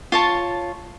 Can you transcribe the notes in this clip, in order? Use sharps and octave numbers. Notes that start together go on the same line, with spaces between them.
F4 C#5 A5